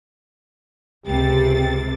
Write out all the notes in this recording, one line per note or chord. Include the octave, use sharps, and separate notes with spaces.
C#2 C3 G4 A6